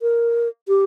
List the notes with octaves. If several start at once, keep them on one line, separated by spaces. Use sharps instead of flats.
A#4
G4